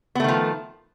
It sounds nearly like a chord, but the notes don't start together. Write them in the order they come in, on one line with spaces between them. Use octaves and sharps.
B3 A3 D#3 F3